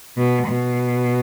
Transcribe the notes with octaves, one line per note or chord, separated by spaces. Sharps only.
B2
B2